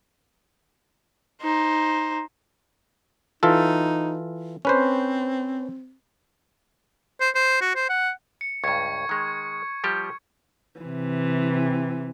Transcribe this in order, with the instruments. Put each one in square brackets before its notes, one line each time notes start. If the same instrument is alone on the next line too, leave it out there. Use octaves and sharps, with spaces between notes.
[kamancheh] D#4 C5
[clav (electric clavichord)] E3 F4 A4 [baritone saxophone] D#4
[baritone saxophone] C4 [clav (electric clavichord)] C#4 B4 C5
[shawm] C5
C5
F#4
C5
F#5
[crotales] C#7
[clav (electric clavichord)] C#2 G2 [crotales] C#6 G#6 C#7
[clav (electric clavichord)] D#3 G#3
F3 G3 G4
[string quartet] C3 E3